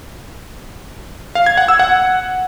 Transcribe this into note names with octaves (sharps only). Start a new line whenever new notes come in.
F5
G#6
F#5
E6
F#5